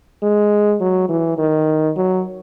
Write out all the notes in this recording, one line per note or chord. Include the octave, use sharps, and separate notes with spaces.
G#3
F#3
E3
D#3
F#3